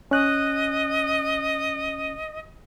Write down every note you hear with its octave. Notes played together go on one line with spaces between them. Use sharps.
C#4 D#5 F#6